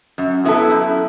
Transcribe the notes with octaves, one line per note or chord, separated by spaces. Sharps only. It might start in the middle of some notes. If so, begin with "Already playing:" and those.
F#2
F#3 B3 E4 A4
F#2